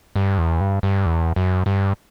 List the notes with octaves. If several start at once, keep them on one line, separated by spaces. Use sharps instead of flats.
G2
E2
G2
G2
E2
F#2
G2